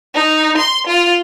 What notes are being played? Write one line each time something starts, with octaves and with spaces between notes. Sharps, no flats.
D#4
C6
F4